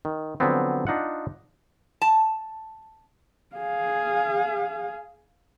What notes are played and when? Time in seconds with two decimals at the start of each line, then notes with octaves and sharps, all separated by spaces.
0.05 D#3
0.40 D3 F3 F#3 B3 C4
0.87 D4 D#4 F4 F#5
2.02 A5
3.57 G#4 F5